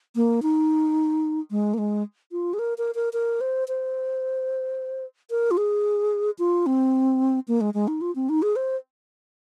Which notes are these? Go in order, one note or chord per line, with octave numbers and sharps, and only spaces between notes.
A#3
D#4
G#3
A#3
G#3
F4
G#4
A#4
A#4
A#4
A#4
C5
C5
A#4
F4
G#4
F4
C4
A#3
G#3
G#3
D#4
F4
C4
D#4
G#4
C5